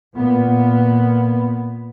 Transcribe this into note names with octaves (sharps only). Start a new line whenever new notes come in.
A#2 B3